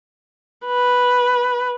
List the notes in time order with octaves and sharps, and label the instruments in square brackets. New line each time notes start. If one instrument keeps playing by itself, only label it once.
[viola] B4